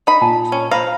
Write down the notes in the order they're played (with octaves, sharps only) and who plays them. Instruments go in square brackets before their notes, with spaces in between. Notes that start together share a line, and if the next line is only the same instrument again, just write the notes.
[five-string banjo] D#4 B5
[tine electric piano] A#2 [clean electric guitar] G#5 A5
[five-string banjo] C#4
[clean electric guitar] C5 B5 [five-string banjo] F5 [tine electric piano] A#5